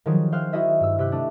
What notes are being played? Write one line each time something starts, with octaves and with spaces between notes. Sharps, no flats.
D#3 F3 F#3 G#4
G#4 C5 F5 G5 F6 F#6
E4 F#4 G#4 D#5 E5
G2 E6
C3 G4 E6 F#6
A3 D4